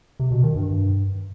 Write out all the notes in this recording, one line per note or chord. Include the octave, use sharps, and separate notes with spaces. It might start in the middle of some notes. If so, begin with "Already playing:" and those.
C3
B2
D#3
G2